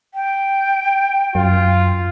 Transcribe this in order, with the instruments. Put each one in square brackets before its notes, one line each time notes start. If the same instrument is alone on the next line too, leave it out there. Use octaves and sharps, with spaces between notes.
[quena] G5
[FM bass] F#2 [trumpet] F4